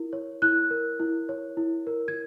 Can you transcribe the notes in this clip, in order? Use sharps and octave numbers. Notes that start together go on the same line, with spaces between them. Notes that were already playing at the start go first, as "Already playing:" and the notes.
Already playing: E4 A#4
C#5
E4 F#6
A#4
E4
C#5
E4
A#4
G#6